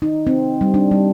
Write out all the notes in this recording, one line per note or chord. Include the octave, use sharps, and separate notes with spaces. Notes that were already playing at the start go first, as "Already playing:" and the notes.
D#4
C4
G3
D4
G3